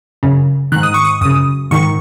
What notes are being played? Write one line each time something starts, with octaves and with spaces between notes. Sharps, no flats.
F#2 C#3
G#2 D#3 F#6
D#6
C#6
D#6
F#2 C#3 D#6
G#2 D#3 C#6